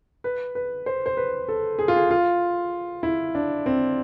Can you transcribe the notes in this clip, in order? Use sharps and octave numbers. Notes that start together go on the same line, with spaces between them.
B4
B4
C5
C5
B4
A4
G#4
F4
G#4
F4
E4
D4
C4